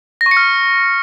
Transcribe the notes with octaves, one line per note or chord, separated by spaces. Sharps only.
A#6
C#6
C#7
F6